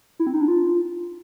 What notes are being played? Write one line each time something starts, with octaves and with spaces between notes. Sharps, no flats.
E4
C4
D#4
D4
F4